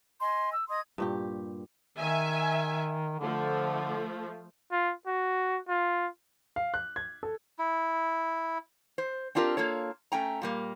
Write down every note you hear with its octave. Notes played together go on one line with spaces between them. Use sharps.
D#5 G#5 C6
E6
D#5 C6 D#6 G#6
G2 A#2 G4
D#3 E5 G#5
D3 F3 A3
F4
F#4
F4
F5
F#6
G#6
A4
E4
C5
C4 D4 F4 G4 A#4
A#3 F4 A4 C#5
A3 C#4 G5 A#5
A#2 G3 A#3